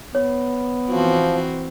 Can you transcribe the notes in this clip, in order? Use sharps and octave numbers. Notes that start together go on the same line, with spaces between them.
B3 C#5
E3 F3 C4 F#4